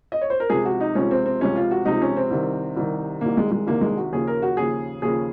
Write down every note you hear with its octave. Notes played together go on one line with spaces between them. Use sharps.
D#5
C#5
C5
A#4
C#2 C3 F3 G#4
F#4
D#4
C#2 C3 F3 C#4
C4
C4
C#2 C3 F3 C#4
F4
F#4
C#2 C3 F3 D#4
C#4
C4
C2 C3 D#3
C2 C3 D#3
C2 C3 D#3 A#3
G#3
G#3
C2 C3 D#3 A#3
G#3
F#4
D#2 C#3 F3 G#4
A#4
F#4
D#2 C#3 F3 G#4
D#2 C#3 F3 G#4